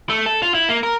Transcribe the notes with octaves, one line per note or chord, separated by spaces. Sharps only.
A3
A4
F4
E4
A#3
A#4